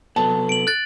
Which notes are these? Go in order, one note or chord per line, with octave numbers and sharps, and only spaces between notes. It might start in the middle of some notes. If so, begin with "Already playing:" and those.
C3 F#3 B3 A4 A5
D7 F#7
F#6 A6